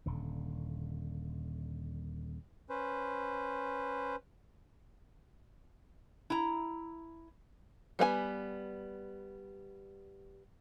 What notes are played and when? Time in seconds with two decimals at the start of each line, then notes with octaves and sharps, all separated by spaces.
0.06 D#1 D3
2.69 C#4 B4 C5
6.30 E4 A#5
7.99 G3 B3 F#5 G#5